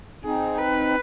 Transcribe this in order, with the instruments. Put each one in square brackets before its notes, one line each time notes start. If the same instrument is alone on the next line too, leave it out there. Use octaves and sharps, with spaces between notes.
[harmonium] C4 D#4 [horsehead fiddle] G#4
[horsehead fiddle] B4